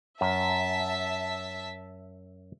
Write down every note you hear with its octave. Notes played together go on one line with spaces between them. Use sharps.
F#2 E5 A5 B6